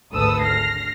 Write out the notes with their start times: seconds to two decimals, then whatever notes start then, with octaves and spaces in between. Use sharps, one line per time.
0.13 G#1 D2 A4 B4 D#6 E6
0.43 F6 A#6 C7